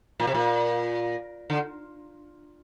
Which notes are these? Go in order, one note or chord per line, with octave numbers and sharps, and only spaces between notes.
A#2
C3
A#2
D3